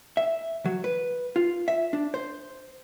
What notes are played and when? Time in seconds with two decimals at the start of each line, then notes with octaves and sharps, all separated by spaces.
0.17 E5
0.65 F#3
0.84 B4
1.36 F4
1.68 E5
1.93 D4
2.14 C5